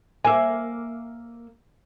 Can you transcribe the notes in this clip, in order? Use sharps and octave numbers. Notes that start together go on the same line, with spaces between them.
A#3 E5 G#5